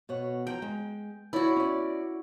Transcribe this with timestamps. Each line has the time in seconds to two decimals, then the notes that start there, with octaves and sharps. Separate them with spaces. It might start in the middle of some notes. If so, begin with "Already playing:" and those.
0.09 B2 C#5 F#5
0.47 F3 G5 A#5
0.62 G#3
1.33 E4 F#4 C#5 D5
1.56 C#4 D5